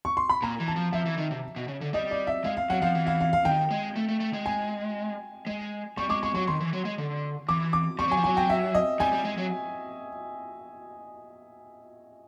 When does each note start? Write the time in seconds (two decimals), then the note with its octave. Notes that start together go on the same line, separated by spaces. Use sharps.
0.05 C#6
0.17 C6
0.29 B5
0.42 A#2 A#5
0.60 E3
0.68 A5
0.76 F3
0.93 F3 E5
1.06 E3
1.18 D#3
1.31 C3
1.56 B2
1.68 C#3
1.81 D3
1.93 G3 D#5
2.11 D5
2.27 E5
2.44 G#3 F5
2.57 F5
2.70 F#3 F#5
2.82 F3 F5
2.95 E3
3.07 F5
3.20 F5
3.33 F5
3.45 D#3 G5
3.71 G#3
3.96 A3
4.08 A3
4.20 A3
4.33 G#3
4.46 G#5
5.47 G#3
5.97 G3 C#6
6.09 G#3 D6
6.23 G#3 C#6
6.35 F#3 C#6
6.47 D#3 C6
6.60 E3
6.73 F#3
6.85 G#3
6.98 D3
7.49 E3 D6
7.73 D6
7.99 G3 C#6
8.08 F#3 G#5
8.17 F3
8.24 F#3 G#5
8.37 G5
8.50 E5
8.75 D#5
9.00 G3 G#5
9.13 G3
9.25 G#3
9.38 F#3